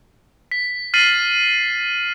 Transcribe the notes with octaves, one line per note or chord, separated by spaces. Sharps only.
B6
F6 A6 B6 C7 D#7 F#7